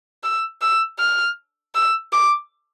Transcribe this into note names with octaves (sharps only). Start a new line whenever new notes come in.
E6
E6
F6
E6
D6